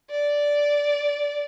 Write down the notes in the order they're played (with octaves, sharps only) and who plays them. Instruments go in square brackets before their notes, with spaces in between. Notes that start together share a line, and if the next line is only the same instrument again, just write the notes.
[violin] D5